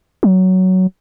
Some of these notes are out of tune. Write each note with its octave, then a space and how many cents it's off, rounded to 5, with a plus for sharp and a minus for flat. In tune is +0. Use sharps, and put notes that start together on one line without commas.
F#3 +10